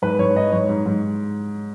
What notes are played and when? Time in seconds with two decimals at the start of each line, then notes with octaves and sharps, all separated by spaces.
0.02 G#2 B4
0.19 G#2 C#5
0.35 G#2 D#5
0.52 G#2 C#5
0.69 G#2
0.86 G#2